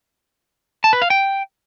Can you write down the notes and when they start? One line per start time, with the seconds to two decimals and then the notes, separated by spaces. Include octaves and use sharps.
0.84 A5
0.93 B4
1.02 F5
1.10 G5